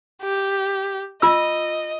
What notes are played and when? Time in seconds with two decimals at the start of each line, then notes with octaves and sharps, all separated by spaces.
0.22 G4
1.22 F4 D#5 E6